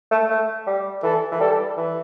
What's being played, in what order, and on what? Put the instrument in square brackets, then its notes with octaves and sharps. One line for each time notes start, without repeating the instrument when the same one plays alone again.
[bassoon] A3
A3
G3
[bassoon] E3 [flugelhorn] A4
[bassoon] E3
[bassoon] G3 [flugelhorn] A4
[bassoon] E3